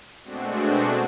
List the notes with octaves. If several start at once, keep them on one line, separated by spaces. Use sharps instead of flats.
B2 G#3 A3 C4 D4 F#4